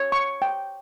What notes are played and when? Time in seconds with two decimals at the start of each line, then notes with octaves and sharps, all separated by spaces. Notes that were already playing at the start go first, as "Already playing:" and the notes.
Already playing: C#5
0.12 C#6
0.42 G5